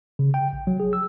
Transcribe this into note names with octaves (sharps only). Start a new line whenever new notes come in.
C#3
G5
A#1
F#3
G#4
E6